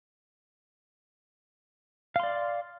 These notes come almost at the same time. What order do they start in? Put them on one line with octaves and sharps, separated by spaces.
F5 C6 D5